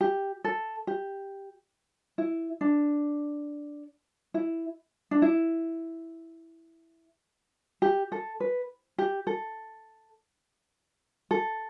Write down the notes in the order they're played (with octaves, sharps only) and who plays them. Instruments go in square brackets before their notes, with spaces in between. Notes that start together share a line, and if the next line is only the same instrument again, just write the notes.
[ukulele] G4
A4
G4
E4
D4
E4
D4
E4
G4
A4
B4
G4
A4
A4